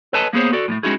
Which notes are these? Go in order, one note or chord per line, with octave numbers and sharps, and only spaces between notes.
A4 B4 C#5 D#5 G#5 A5
A#3 B3 G#4 C5 C#5
F#4 A4 D5
A2 G#3 A3
G#3 C#4 D#4 E4 F#4 G#4